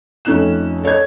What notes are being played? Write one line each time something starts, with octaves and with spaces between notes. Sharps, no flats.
F2 A3 C#4 D#4 F#6 E7
A4 C#5 D#5 G#6